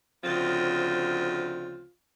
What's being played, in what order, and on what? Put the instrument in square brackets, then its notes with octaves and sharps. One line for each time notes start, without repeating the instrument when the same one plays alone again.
[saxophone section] D2 C#3 F3 C4 F4